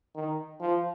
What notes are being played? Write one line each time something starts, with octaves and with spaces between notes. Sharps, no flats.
D#3
F3